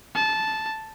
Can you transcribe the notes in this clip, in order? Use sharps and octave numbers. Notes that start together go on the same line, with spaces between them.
A5